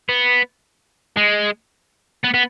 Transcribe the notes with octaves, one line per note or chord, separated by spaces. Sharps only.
B3
G#3
B3
B3